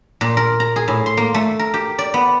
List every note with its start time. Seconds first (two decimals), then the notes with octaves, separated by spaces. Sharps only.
0.21 A#2
0.37 A#4
0.60 A#5
0.76 G#4
0.88 A2
1.06 C6
1.17 A#3
1.34 A3
1.59 A#4
1.74 G4
1.98 D5
2.14 B3